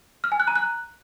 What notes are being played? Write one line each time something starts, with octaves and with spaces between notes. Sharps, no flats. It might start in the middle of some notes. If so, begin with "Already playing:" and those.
F6
G#5
F#6
A#5
F#6